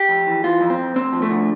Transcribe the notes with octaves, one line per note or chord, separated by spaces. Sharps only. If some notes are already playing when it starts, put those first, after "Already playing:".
Already playing: G4
F2
E3
E3 F4
F2
C4
F2
D2 C4
F3
A3
D3